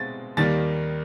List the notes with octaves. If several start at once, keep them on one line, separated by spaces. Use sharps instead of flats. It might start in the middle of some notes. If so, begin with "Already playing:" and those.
Already playing: B2 G#3 C4 A6
D#2 D#3 G3 A#3 A6